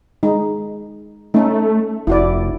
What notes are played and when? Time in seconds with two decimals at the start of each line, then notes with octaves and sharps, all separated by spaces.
0.23 G#3 D#4
1.34 A3 C#4 D#4
2.07 F1 E4 F#4 D5